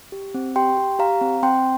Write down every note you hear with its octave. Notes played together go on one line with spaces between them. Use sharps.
G4
C4
G4 G5 C6
G4
G4 F5 A#5
C4
C4 G5 C6